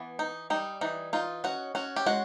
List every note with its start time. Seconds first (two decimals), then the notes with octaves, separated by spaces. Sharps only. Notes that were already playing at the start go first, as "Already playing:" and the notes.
Already playing: E3 B3
0.19 D#4
0.50 G3 D#4
0.81 E3 D#4
1.13 D#4 F4
1.44 C#4 F#4
1.75 C#4 F#4
1.96 G4
2.06 G#3 F#4